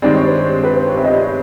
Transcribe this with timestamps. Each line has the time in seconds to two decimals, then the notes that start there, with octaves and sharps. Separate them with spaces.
0.02 G2 D#3 G#3 C4 D5
0.15 C#5
0.27 C5
0.39 C#5
0.63 B4
0.75 C5
0.87 C#5
0.97 E5
1.05 D#5
1.13 D5
1.20 C#5